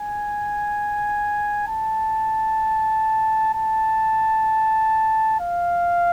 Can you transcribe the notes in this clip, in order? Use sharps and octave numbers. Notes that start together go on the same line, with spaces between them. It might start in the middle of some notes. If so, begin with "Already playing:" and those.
Already playing: G#5
A5
A5
F5